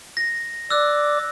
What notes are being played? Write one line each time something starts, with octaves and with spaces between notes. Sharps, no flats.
A#6
D5 D6 E6 F#6